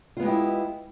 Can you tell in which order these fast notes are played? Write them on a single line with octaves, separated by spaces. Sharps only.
F4 B3 G#3 G4 E4